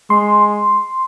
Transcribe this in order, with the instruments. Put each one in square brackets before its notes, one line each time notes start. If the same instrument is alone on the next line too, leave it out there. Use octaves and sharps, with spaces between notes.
[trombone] G#3 [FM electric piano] C6